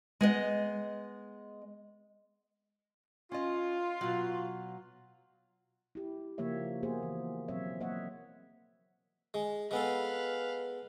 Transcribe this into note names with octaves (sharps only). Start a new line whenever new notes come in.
G#3 B3 D#5
C#4 F4 D#5
B2 F#3
E4 G4
C#3 F3 A#3 G4 C#5 E5
A#3 B3 F#4 G#4 C5
E3
B2 F#3 C4 C#5 E5
F#3 A#3 C#5 D#5 E5 F#5
G#3
G#3 B3 A4 B4 F5